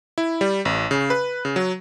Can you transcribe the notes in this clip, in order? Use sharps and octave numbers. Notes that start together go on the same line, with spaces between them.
E4
G3
A1
C#3
B4
C#3
F#3